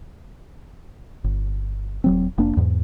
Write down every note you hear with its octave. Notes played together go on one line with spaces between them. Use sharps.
G1
D#1 F#3 C4
F1 A#3 D4
E2 G#2